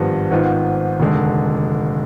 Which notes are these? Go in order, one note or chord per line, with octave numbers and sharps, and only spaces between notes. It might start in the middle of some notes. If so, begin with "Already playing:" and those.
Already playing: G#1 G2 F3 B3 F4
G#1 G#2 D#3 B3 F4
F1 D#2 D3 G#3